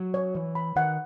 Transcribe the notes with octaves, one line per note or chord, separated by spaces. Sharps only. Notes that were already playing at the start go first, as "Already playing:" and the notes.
Already playing: F#3
C#5
E3 C#5
B5
D#3 F#5